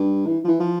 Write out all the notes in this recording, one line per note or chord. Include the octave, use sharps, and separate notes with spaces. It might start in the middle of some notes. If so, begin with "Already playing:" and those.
Already playing: G2
E3
F3
E3
F3